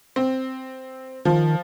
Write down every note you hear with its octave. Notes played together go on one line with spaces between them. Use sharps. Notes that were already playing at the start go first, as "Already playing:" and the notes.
C4
D#3 F3